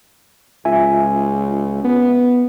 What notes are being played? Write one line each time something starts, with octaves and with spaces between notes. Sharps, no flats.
C#2 F4 E5 G#5
B3